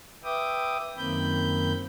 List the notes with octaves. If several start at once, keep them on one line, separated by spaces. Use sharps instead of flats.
B4 E5 G5 D6 D#6
F#2 D#3 A#3 C4 B5 G6